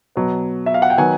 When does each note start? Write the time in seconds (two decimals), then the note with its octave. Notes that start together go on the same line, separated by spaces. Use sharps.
0.16 B2 F#3 B3
0.66 E5
0.74 F5
0.82 F#5
0.90 G5
0.98 D#3 F#3 B3 F#5 G#5